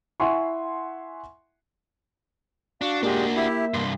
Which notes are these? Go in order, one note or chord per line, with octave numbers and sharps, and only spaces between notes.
E4 E5 F#5 G#5 C6 C#6
D4 F#4 F5 F#5
A#2 G#3 A#3 D4 F#4 G4 A#4
E4 G4 E5
C2 G2 C6